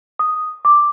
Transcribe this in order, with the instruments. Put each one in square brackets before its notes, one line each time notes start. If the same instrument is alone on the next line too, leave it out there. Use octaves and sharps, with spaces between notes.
[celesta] D#6
D6